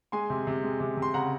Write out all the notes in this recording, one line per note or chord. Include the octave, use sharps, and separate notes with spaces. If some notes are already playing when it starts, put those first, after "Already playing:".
G#3 G#5 C6
C3
C3
G#3
C3
C3
C6
C#3 F#5 A#5